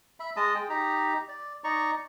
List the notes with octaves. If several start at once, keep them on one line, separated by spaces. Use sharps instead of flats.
E5 B5
G#3 D#5 A5 D#6
G#4 G5
D#4 G4 A#5
D5
D#4 D5 A#5 C#6